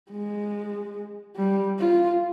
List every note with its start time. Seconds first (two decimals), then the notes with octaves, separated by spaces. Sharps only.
0.11 G#3
1.36 G3
1.79 F4